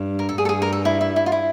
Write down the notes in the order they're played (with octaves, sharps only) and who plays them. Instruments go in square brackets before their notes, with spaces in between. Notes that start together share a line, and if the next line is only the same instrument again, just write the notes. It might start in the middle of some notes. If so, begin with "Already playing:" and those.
Already playing: [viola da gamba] G2
[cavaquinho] A#4
A4
[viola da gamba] G2 [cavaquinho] G#4
[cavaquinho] A4
G#4
A#4
A4
E4
E4
E4
F4
E4